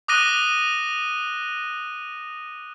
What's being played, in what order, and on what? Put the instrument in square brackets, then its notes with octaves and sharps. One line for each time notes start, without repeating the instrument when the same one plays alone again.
[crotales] D6 D#6 F#6 A#6 D#7 G7